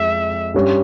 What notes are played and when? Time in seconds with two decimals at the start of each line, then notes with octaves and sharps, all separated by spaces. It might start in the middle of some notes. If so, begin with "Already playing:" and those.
Already playing: F2 G#3 E5
0.54 G2 G3 C#4